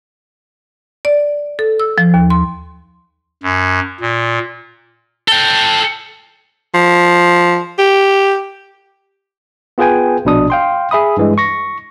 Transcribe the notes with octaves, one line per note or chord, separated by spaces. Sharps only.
D5
A4
E6
F3
D#2
C6
F#2
A#2
A4 G5
F3
G4
B3 F4 G#4 B4 G5 G#5
A#1 B2 D4 D#6
F5 G5 C6
G#4 E5 B5 D#6
G2 E3 G#3
C#6 A#6